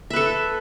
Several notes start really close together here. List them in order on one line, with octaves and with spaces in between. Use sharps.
E5 B4 A4